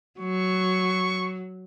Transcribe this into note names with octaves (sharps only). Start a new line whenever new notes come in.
F#3 C#6